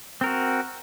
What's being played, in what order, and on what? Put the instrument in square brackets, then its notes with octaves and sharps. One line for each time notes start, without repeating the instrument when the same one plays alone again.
[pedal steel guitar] C4
A#4
F#4